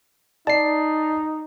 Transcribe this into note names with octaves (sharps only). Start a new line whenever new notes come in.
D#4 D5 A5 C7